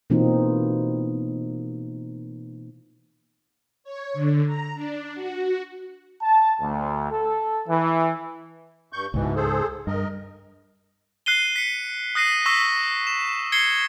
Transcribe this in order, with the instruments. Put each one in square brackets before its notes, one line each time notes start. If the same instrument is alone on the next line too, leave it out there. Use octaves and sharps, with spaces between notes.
[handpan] B2 E3 A#3 C4 D#4 F4
[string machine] C#5
D3
A#5
D4
F#4
[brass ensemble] A5
D2
A4
E3
[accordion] G2 C#6 G6
[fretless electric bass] C#2 G#2 [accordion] B2 E3
[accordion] G#4 A4 C5
[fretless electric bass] G2 [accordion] A#4 D#5
[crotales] F#6 C7 D#7 G7
B6 C#7
D#6 F#6 A#6 C7 D#7
C#6 E6 A#6 B6
E7
G#6 C7 C#7 G7